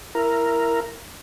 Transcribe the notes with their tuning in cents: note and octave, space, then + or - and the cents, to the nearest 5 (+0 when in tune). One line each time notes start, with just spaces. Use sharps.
E4 +15 A#4 +0